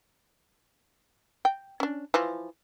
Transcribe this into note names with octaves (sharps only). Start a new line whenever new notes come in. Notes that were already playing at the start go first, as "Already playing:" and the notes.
G5
C#4 D4
E3 F3 F4